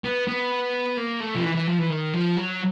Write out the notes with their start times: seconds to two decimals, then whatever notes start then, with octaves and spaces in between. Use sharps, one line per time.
0.05 B3
0.28 B3
0.97 A#3
1.20 A3
1.36 F3
1.43 E3
1.55 E3
1.67 F3
1.79 E3
1.90 D#3
2.13 F3
2.36 F#3